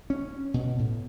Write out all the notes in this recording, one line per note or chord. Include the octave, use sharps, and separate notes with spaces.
C#4
B2
A2